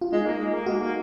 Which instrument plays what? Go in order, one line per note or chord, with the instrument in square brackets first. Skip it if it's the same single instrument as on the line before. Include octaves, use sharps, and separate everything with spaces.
[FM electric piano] F4
[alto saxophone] G#3 [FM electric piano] D#4
[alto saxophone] A#3
G#3
A#3
[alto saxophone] G#3 [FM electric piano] F#4
[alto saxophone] A#3